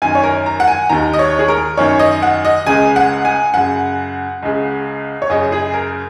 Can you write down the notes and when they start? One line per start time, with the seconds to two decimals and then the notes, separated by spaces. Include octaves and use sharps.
0.02 F#2 D#3 G#5
0.15 C#5
0.23 A#4
0.46 A#5
0.60 F#5
0.68 G#5
0.89 D#2 D#3 A#5
1.13 D#5
1.19 C#5
1.39 G#4
1.48 A#4
1.77 F#2 D#3 C#5
1.99 D#5
2.22 F#5
2.45 D#5
2.66 C#2 C#3 G#5
2.96 F#5
3.25 G#5
3.54 F#2 C#3 F#5
4.43 C#2 C#3
5.22 C#5
5.30 F#2 C#3 D#5
5.52 G#4
5.74 A#4